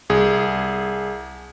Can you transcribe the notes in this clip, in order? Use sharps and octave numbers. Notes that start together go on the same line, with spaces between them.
C2 G#4